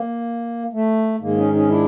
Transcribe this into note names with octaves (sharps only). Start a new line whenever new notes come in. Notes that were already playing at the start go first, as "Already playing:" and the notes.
Already playing: A#3
A3
G#2 D#3 G#3 A#3
C#4 D#4
C#4 D#4
D4 E4